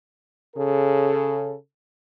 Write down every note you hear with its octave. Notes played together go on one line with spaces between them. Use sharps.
C#3 A4